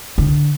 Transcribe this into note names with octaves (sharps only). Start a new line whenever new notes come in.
D3